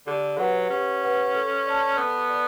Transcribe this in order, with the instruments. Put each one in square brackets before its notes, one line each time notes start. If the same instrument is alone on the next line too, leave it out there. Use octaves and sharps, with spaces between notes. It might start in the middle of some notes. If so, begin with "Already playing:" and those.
[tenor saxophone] D3 [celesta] G4
[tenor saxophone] F#3 [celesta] B4 F#5
[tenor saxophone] C#4 [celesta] G4
[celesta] B4 F#5
A4
D5 A5
[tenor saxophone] B3 [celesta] A4
[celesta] D5